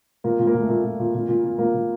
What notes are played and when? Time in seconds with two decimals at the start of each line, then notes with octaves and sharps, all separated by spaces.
0.24 A#2 A#3
0.39 A#2
0.47 A#3
0.54 A#2
0.62 A3
0.68 A#2 A#3
0.84 A#2
0.99 A#2
1.14 A#2
1.28 A#2
1.44 A#2
1.58 A#2 A#3
1.74 A#2